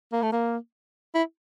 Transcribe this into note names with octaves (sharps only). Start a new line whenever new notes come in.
A#3
A3
A#3
E4